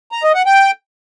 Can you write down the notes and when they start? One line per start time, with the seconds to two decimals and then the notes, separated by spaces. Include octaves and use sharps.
0.12 A#5
0.23 D#5
0.35 F#5
0.46 G5